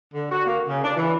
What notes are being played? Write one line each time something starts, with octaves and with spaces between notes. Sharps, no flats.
D3
F#4
A#3
C#3
D4
E3